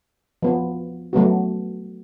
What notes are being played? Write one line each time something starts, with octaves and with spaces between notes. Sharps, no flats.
F3 B3
F#3 A3 B3 F#4